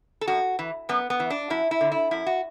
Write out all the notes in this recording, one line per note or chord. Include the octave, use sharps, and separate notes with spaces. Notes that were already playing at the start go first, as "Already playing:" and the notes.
A4
F#2 F#4
E3
F#2 B3
B3
E3
D4
F#2 E4
E4
D3
E4
F#2 E4
F#4